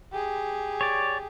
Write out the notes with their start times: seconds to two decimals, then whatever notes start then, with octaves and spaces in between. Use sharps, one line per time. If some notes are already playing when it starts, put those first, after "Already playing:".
0.12 G4 G#4
0.81 C#5 D5